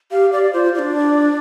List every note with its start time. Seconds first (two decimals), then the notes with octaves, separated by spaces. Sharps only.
0.11 G4 F5
0.33 G4 D5
0.43 D5
0.53 F4 C5
0.75 D4 F4 D5
0.96 D5